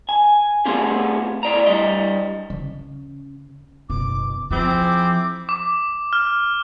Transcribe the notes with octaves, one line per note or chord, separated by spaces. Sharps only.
G#5
A3 B3 C4 F4 G4 G#4
A2 D5 A#5
G2 G3 D#5
C#3
F#1 B2 D6
F3 C4 E4 G#4 D6
D6
F6